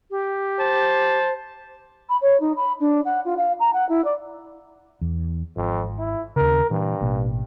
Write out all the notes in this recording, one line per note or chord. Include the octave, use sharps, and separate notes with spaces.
G4
C5 A5
B5
C#5
D#4
B5
D4
F#5
F4
F5
A#5
F#5
E4
D5
E2
G#1 F2
E4
D#2 C#3 A#4
G2 A#2 E3
A1 B2 A#3